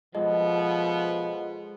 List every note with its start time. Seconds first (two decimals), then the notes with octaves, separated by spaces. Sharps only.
0.15 B2 F3 G#3 F4 A4 D#5